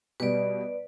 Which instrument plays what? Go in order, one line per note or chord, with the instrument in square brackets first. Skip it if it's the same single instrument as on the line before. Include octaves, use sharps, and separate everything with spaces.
[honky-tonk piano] B2 G3 [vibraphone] B4 D5